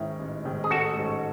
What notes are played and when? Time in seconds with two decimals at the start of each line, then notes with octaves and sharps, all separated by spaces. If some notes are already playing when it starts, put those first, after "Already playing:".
Already playing: G#2 D#3 G#3 C#4 E4
0.19 A1
0.44 G#2 D#3 G#3 C#4
0.64 G#4
0.70 A1 F#4 A4
0.97 G#2 D#3 G#3 C#4